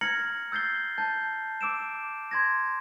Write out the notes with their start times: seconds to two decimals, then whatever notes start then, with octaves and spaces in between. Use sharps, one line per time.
0.01 A#5 F6 G#6 A#6 C#7 F#7
0.52 E6 G6 A6 C7 G7
0.98 A5 G6 A6
1.61 D6 E6 D7 E7
2.31 C6 G#6 A#6